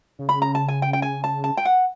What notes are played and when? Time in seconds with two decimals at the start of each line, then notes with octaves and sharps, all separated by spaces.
0.19 C#3
0.29 B5
0.42 A#5
0.55 A5
0.68 G#5
0.82 G5
0.93 G5
1.02 G#5
1.24 A5
1.44 A5
1.57 G5
1.65 F#5